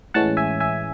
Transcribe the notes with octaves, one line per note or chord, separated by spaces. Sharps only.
A2 E3 G#3 C#4 F#5 A5
E5 G#5
E5 G#5